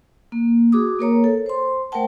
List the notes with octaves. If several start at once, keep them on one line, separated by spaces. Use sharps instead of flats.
A#3
F#4 G#4 D6 D#6
A#3 A#4 C#5 A#5
A4
C5 C6
A3 A#4 C5 F#5 G5 A5